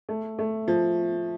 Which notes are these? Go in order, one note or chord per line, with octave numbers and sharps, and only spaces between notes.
A3
A3
F3